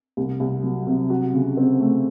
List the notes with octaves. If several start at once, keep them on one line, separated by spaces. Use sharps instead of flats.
C2
C2
F#3
C3
F#4
C#3
C4
A3